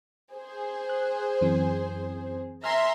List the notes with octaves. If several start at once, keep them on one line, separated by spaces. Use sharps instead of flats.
G#4 C5
F#6
F#2 E3 C4
E5 G#5 A#5 C6 F6